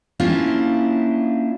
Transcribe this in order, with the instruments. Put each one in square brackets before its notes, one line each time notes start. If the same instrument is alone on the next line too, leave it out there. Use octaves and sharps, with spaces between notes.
[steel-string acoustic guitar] A#3 C#4 D4 E4 F4 G4